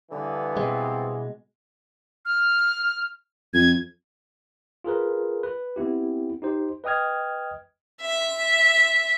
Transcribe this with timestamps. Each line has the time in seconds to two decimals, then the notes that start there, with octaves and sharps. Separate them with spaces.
0.11 G2 D3 E3 B3
0.57 B2 G#3 C4
2.25 F6
3.54 F2 G#6
4.84 F4 G#4 A#4 B4
5.43 B4
5.76 B3 C4 E4 G4
6.42 D#4 G4 C5
6.84 B4 D#5 G5 D#6 F6 G#6
8.01 E5